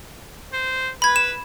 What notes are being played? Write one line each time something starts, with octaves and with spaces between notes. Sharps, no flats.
C5
B4 B5 G#6
E7